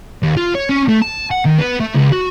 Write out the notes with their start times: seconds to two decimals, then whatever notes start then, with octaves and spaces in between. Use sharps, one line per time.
0.23 D#2
0.37 F4
0.55 C#5
0.69 C#4
0.89 A3
1.02 A5
1.31 F#5
1.45 D#3
1.58 B3
1.80 A3
1.94 C#2
2.12 F#4